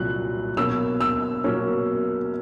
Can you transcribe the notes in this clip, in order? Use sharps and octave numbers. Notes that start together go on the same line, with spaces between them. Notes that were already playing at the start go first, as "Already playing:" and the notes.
Already playing: C2 A#2 F#3 F#6
B2 F#3 A#3 C#4 E6
E6
B2 F#3 A#3 C#4